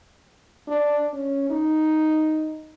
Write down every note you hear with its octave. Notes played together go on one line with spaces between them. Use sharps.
D4
C#4
D#4